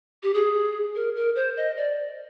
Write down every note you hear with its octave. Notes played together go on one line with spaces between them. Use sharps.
G4
G#4
A#4
A#4
C5
D#5
D5